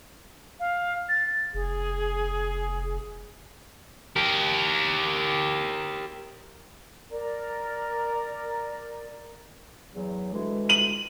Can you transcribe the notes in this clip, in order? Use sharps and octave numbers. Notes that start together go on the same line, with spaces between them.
F5
A6
F1 G#4
G4 A#4
A#4 D5 A#5
E2 F#3
D2 E3 G#3
D#7 F#7